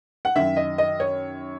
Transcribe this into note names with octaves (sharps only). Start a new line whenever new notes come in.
F#5
F#2 D#3 E5
D#5
D#5
C#5